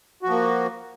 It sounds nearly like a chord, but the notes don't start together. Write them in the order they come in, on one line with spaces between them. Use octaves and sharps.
F#4 F3 A#3